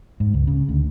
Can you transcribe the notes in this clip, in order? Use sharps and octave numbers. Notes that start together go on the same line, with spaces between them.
G#2
C#2
C#3
D2